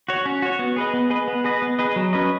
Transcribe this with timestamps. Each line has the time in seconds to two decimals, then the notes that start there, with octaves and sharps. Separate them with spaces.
0.08 F#4 C#5
0.26 C#4
0.42 F#4 C#5
0.59 B3
0.76 G#4 B4 D#5
0.93 B3
1.10 G#4 B4 D#5
1.28 B3
1.44 G#4 B4 D#5
1.62 B3
1.79 G#4 B4 D#5
1.96 F#3
2.13 C#4 B4 D#5